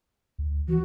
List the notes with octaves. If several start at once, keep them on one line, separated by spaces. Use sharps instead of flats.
D2
E3 F#4